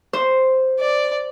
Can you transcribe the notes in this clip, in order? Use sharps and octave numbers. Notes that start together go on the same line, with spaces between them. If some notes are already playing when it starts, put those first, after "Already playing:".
C5
D5